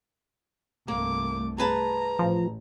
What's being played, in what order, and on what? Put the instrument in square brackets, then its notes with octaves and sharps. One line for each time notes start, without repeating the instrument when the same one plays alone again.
[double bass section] C2 G2 A3 [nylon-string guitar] A#3 [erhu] D6
[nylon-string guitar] G#4 B4 A5 [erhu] A#5
[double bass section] A1 [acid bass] F3